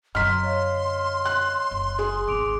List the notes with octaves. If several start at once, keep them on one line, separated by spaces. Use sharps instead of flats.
F#2 D3 D#5 A#5 C6 C#6 F6 B6
C#5 D#5 F5
F#6
F#1
G#4
G#1 D2 D6 D7 F7